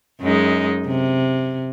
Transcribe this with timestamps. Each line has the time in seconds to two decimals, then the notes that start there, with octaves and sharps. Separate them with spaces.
0.21 F#2 G#3 D#4
0.86 C3